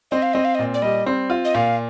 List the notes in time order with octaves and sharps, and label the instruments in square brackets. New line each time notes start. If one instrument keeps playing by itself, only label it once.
[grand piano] C4 [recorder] D#5
[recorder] F5
[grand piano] C4 [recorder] D#5
[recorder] F5
D#5
[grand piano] A#2
[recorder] D5
[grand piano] G3 [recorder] D#5
[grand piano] C4
F4
[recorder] D#5
[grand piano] A#2 [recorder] F5